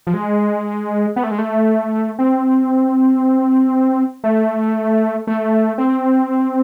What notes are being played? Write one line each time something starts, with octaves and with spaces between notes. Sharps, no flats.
F3
G#3
B3
A3
G#3
A3
C4
A3
A3
C4